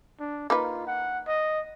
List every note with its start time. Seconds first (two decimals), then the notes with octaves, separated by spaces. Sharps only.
0.20 D4
0.50 A#3 D#4 F4 B4
0.87 F#5
1.28 D#5